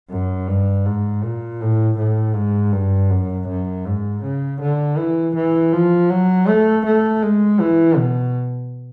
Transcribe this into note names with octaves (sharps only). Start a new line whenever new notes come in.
F#2
G2
G#2
A#2
A2
A2
G#2
G2
F#2
F#2
G#2
C#3
D3
E3
E3
F3
F#3
A3
A3
G#3
E3
B2